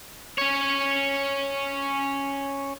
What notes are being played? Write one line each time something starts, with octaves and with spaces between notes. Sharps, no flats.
C#4 C#5